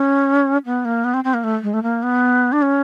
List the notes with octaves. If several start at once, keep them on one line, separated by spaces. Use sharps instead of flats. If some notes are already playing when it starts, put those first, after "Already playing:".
Already playing: C#4
B3
A#3
B3
C4
C4
A#3
A3
G#3
A3
A#3
B3
D4
C#4